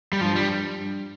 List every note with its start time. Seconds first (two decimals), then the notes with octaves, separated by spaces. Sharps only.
0.13 G3
0.21 G2 F3
0.36 G3